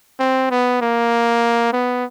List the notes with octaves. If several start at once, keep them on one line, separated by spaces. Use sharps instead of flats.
C4
B3
A#3
B3